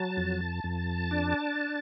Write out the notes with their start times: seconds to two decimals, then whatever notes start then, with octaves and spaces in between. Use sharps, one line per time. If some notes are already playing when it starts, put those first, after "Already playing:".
Already playing: F#3 A5
0.17 F2
0.64 F2
1.11 D4